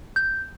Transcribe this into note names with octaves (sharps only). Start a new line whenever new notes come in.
G6